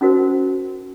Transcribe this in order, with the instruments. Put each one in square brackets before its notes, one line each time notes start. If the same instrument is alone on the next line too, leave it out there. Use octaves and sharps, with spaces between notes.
[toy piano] C#4 D#4 F#4 A#4 C5